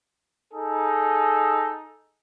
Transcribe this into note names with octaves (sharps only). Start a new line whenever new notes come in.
D#4 G#4 A4